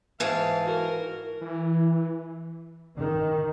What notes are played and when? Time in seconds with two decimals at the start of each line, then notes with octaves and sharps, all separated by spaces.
0.20 G#2 E3 F5 A5
0.63 F#4 A#4
1.41 E3
2.97 D#3